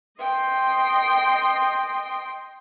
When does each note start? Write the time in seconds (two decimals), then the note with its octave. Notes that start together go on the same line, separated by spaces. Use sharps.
0.19 D#5 G5 C6